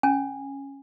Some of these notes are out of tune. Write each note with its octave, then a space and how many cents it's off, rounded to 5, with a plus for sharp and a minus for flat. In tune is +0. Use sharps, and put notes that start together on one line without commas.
C#4 -10 G#5 -15